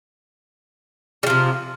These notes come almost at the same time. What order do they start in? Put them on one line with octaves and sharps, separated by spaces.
G3 F3 C3